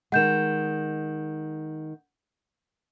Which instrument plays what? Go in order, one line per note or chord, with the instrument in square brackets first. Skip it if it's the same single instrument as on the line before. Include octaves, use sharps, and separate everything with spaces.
[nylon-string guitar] D#3 G#3 [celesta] F#5 G6 E7